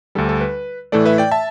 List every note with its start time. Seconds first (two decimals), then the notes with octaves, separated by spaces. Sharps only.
0.15 D2 D3 G3 A4
0.29 A4
0.41 B4
0.92 A2 E3 A3 A4 D5
1.05 B4 E5
1.18 D5 G5
1.31 E5 A5